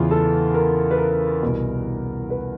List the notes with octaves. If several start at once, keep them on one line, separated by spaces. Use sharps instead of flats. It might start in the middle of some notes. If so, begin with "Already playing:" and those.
Already playing: E2 C#3 E3 F4
A4
A#4
B4
A#4
C2 B2
B4